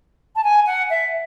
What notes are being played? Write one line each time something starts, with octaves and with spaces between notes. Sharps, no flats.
A5
G#5
F#5
E5